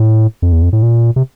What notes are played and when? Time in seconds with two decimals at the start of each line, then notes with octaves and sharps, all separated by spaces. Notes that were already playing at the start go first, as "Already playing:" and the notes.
Already playing: A2
0.42 F2
0.52 E2
0.62 F2
0.73 A2
0.83 A#2
1.16 C3